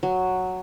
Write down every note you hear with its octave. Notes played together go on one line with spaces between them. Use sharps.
F#3